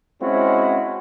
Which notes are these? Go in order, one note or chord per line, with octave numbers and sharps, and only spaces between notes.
G#3 C4 C#4 E4 F#4